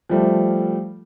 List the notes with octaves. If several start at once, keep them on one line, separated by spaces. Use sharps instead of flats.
F3 G3 A3